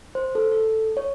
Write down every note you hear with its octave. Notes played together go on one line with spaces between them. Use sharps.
C5
A4
A4
C#5